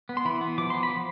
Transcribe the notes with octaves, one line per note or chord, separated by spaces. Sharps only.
B3
C6
E3 B5
B3
F3 D6
B3 C6
B5
F3